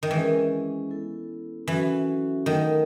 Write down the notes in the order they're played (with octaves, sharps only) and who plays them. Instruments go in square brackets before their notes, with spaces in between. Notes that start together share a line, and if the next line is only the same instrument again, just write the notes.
[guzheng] D#3
[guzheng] E3 [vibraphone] G#3 C#4 G#4 B4
[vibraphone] B3 E4 A4
[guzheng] E3 [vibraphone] F#3 C#4 F#4 A4 E5
[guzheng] D#3 [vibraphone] F#3 A3 D#4 A4 D#5